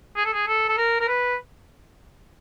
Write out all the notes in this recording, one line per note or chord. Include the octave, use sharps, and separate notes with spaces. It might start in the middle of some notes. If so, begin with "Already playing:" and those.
G#4
A4
G#4
A4
A4
A#4
A#4
B4